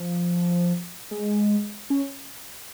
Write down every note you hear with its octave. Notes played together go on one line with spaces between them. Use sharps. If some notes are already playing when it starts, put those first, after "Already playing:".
Already playing: F3
G#3
C#4